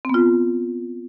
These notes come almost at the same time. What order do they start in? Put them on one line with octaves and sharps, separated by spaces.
C4 B3 F4